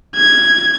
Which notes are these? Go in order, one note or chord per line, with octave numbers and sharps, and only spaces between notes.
G#6